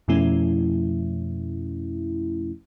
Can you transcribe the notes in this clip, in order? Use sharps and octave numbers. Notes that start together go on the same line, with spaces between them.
F2 B2 F3 A3 C#4 E4